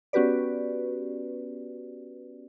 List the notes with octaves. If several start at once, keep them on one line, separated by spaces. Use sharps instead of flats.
B3 C#4 F#4 G4 B4 D5